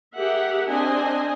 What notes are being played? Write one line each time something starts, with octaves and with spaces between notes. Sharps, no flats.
G4 G#4 A#4 E5 F#5
C4 D4 D#5 G#5